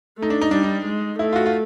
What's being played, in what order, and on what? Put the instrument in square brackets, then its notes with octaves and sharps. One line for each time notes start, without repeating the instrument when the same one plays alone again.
[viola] A3 [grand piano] D#4
[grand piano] D4
D#4
[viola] G3 [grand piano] D4
[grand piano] D#4
[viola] G#3
[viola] A3 [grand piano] E4
[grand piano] F4
F#4
F4